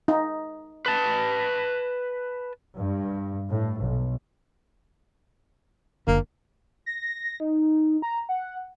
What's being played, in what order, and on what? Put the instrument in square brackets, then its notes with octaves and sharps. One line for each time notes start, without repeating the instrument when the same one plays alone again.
[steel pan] D#4
[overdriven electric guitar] B4 A5
[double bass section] G2
A2
B1
[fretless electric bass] F#1 D3 [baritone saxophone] A#3
[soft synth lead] A#6
D#4
A#5
F#5